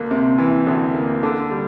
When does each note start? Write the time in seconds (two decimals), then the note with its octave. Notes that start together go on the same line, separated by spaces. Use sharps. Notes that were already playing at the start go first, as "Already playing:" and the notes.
Already playing: D2 A#3
0.11 C3
0.38 E3
0.66 D2
0.95 A#3
1.23 D3
1.51 G3